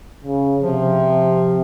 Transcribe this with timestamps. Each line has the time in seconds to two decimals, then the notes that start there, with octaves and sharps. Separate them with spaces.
0.24 C#3
0.62 C3 F3